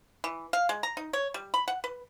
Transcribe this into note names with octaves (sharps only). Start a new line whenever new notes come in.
E3
F5
G#3
A#5
D#4
C#5
G3
B5
F#5
B4